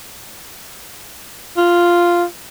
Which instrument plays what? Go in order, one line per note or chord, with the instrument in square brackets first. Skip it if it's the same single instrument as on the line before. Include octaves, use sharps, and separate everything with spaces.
[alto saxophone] F4